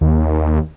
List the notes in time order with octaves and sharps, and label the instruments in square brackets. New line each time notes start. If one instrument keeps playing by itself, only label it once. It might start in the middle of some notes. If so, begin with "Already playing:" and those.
[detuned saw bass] D#2